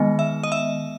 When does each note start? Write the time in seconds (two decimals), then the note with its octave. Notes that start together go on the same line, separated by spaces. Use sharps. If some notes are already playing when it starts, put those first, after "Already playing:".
Already playing: D#3 G#3 B3
0.19 E5
0.43 D#5
0.52 E5